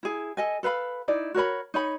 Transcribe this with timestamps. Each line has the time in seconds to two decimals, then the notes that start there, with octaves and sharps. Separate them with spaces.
0.03 E4 G#4
0.37 A4 D#5 G#5
0.63 A4 B4 F5 B5
1.08 D#4 E4 D5
1.34 F#4 A#4 C#5 B5
1.74 D#4 C#5 B5